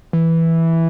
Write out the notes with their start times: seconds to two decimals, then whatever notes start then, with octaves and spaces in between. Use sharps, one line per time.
0.13 E3